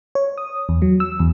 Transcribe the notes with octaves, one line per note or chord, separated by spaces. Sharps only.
C#5
D#6
E2
F#3
E6
E2